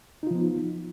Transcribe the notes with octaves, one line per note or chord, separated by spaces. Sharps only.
F3 B3 D#4 F4